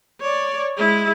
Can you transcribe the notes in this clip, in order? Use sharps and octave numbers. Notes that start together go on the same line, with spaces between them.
C#5 D5
G#3 E4